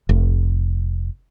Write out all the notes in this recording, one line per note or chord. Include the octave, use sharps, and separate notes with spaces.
F1